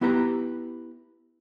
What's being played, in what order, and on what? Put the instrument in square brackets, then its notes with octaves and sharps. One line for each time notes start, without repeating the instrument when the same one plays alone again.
[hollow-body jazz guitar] B3 E4 G4 B4 A#5